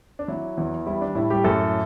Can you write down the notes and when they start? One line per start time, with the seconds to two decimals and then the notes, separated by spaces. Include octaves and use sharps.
0.19 D4
0.28 F#3 E4
0.57 E2
0.87 G3 E4
1.01 D4
1.15 A2 E4
1.30 G3 G4
1.44 F#2 A3 A4